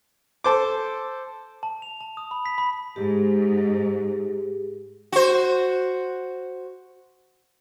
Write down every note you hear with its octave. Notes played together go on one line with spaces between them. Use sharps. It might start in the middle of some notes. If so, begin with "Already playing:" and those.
A4 C5 D6
A5
F7
A5
D#6
B5
B6
B5
G#2 G4 G#4
F#4 C5